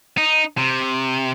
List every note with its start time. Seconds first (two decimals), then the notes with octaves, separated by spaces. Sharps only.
0.18 D#4
0.58 C3